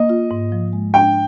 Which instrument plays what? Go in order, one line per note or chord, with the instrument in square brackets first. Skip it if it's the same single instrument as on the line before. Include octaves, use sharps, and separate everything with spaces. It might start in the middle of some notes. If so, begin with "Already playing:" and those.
Already playing: [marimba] A#3 [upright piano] D#5
[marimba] F4
G#2
F3
G#3
[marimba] D4 [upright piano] G5